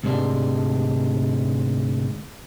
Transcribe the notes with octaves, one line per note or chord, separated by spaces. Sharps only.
D2 G#2 C3 G#3 D4